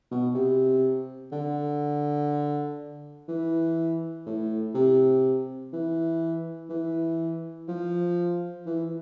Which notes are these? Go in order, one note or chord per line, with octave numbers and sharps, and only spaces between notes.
B2
C3
D3
E3
A2
C3
E3
E3
F3
E3